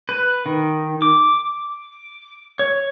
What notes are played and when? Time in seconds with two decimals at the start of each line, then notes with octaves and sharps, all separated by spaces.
0.09 B4
0.46 D#3
1.02 D6
2.59 C#5